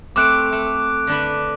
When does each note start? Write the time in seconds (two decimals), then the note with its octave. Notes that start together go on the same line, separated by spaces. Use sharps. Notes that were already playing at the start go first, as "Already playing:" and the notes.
0.16 A3 C4 D6 F#6 D7
0.52 A3
1.07 D3 D4 B4